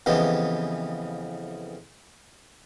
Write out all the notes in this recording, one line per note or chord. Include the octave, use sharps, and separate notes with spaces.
F2 C#3 E3 B3 G4 D#5